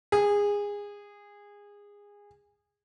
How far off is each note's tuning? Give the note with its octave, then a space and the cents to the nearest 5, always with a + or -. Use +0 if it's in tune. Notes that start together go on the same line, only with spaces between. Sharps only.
G#4 -20